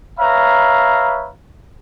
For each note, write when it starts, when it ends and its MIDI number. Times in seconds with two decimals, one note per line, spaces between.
0.19 1.29 71
0.19 1.29 73
0.19 1.29 76
0.19 1.29 77
0.19 1.29 82